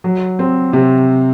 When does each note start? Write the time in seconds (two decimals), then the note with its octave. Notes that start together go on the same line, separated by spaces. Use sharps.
0.04 F#3
0.39 C4
0.73 C3